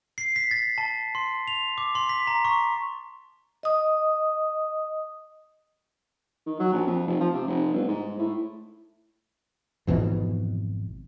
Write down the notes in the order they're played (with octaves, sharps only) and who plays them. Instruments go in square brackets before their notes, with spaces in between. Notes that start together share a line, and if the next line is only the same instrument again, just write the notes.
[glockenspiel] C7
B6
A6
A5
C6
F7
D6
C6
B6
A#5
C#6
[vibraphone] D#5 D#6
[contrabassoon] D#3
F#3
A#1
F2
F1
F3
C3
F1
G1
G#2
A2
[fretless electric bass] G#1 F2 B2 E3